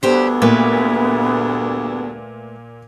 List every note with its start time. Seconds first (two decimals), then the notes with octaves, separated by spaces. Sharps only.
0.03 D2 G2 D3 B3 D4 G4 C5
0.42 A#2 A3 B4 E5